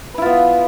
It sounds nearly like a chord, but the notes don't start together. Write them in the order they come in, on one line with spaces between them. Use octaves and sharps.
B4 E4 F4 B3